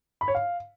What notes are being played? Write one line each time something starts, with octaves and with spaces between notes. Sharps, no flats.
B5
C#5
F5